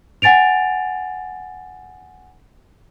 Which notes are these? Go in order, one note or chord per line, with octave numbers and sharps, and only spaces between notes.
F#5 G#5 A6 D7 F7